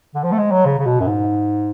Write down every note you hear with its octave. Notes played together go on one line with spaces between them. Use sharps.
D3
F3
A3
G#3
F#3
C#3
C#3
B2
F#2
G#2